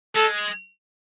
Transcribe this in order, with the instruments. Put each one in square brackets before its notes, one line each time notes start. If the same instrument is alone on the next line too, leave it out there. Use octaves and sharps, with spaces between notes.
[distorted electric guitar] G#3 [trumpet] A4